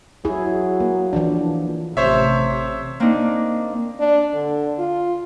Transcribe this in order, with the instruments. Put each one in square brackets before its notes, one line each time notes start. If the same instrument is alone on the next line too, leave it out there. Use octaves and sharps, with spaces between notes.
[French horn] F#3 [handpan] E4 G#4
[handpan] A#3
E3 F3 D4
[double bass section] A1 C3 [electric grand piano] C5 C#5 E5
[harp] A#3 C4 D4 D#4
[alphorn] D4
D3
F4